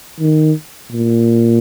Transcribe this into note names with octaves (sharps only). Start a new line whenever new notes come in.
D#3
A#2